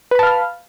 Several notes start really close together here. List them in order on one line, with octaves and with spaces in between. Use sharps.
B4 B5 A5 F5 F6